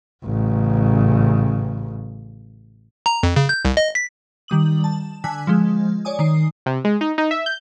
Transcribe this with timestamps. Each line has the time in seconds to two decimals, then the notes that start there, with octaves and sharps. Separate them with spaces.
0.25 A1 C#3
3.06 A#5
3.23 F2
3.36 C#3
3.49 G6
3.65 C2
3.77 D#5
3.95 B6
4.48 D#3 G3 D#6 F#7
4.84 A5
5.24 D3 G#5 E6 F#6 B6
5.47 F3 G#3
6.05 C#5 D5 G#5 D#6
6.19 D#3 D#6 C7
6.66 C3
6.85 G#3
7.01 D#4
7.18 D#4
7.31 E5
7.46 G6